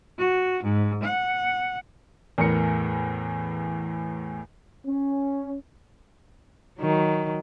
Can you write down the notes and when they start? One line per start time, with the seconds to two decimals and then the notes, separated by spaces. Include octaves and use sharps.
0.19 F#4
0.63 G#2
1.03 F#5
2.38 E2 A2 A#4 C#7
4.86 C#4
6.79 D#3 F#3